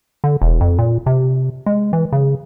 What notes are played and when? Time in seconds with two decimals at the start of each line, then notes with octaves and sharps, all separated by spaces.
0.24 D3
0.42 E1
0.61 F2
0.79 A#2
1.06 C3
1.66 G#3
1.93 E3
2.13 C#3